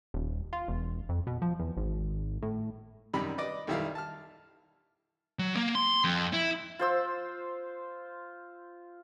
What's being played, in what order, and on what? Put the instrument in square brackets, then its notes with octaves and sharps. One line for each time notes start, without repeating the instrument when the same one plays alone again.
[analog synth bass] D#1
F4
E1
F2
B2
F3
E2
G#1
A2
[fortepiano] F#2 C3 D#3 G3 B5
B4 D5 D#5 D6
B1 D#3 G3 E4 F5
A5 F6
[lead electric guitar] F#3
A#3
C6
F2
E4
[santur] F4 C5 E6